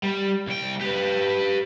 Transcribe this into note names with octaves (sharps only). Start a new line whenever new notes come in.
G3
C2 G5
G4 B4